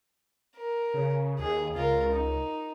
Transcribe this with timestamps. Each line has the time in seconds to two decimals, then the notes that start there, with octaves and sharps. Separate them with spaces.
0.56 A#4
0.94 C#3
1.39 D#2 G#4
1.75 C#2 F4 A#4
2.12 D#4